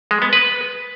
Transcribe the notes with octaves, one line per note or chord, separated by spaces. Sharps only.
G#3
B3
B4